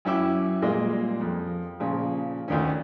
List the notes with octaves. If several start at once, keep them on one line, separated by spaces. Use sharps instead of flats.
F#2 C#4 E4 G5 D6 E6
A#2 G3 G#3 A#3
F2
A#2 C#3 F3
D2 D#3 C#4